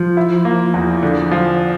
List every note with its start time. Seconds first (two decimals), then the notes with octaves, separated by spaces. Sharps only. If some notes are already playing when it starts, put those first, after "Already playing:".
Already playing: F3
0.17 E4
0.45 A#3
0.74 E2
1.03 D3
1.31 F3